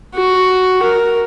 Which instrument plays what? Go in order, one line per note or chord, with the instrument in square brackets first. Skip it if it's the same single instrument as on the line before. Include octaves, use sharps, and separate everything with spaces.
[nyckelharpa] F#4
A#4